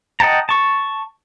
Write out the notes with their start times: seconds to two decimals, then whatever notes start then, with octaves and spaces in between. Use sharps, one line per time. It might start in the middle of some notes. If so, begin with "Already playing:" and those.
0.20 D#5 F#5 G5 A5 A#5
0.49 A5 C#6